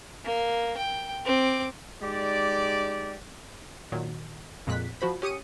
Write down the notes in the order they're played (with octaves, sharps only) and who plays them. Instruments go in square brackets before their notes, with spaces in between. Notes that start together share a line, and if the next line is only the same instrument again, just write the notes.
[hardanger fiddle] A#3
G5
C4 D6
[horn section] G#3 D#4 G4 D5
[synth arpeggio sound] A#2 D#3 F#3
F2 A#2 G#3 F#6 B6
F3 F#4 C5 B5
C#4 G4 D#6 C#7 D#7